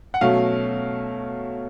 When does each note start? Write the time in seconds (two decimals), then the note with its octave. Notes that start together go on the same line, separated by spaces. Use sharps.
0.14 F#5
0.21 B2 F#3 A3 C#4 F5